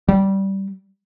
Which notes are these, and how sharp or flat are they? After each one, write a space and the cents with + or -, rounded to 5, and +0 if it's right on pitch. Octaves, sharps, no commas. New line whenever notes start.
G3 -15